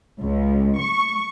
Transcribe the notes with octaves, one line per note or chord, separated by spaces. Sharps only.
C#2
C#6